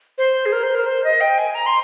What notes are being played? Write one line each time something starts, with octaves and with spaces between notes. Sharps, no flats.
C5
G#4
A#4
C5
A#4
C5
D#5
G5
G#5
A#5
C6